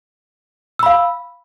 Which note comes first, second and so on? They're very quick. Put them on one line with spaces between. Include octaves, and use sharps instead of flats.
E6 B5 F5